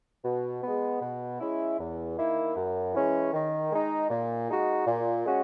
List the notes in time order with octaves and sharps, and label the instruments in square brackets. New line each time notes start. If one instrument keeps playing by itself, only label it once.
[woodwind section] B2
B3
G#3
B2
G#3 C#4 E4
E2
D#3 A#3 E4
F#2
E3 G#3 C#4
D#3
G#3 D#4
A#2
G#3 D#4 F#4
A#2
G#3 C#4 F#4